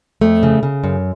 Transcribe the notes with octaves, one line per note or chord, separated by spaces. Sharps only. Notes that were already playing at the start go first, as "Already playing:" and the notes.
F2 A3
C#3
C#3
F#2